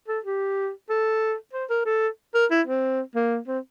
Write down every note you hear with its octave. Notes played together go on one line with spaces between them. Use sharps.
A4
G4
A4
C5
A#4
A4
A#4
E4
C4
A#3
C4